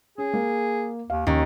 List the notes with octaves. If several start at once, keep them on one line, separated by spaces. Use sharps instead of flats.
C#4 G#4
A#3
D#2 F5
D#2 C#4